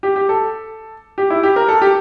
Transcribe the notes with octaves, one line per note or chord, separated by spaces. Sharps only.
G4
G4
A4
G4
E4
G4
A#4
A4
G4